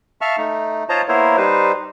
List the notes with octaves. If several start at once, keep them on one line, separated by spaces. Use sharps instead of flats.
E5 F5 A5 C#6 F6
A3 D#4
F4 C5 C#5 D#5 A5 A#5
A#3 B3 E4 A#4 C5 C#5
G3 D#4 B4 C5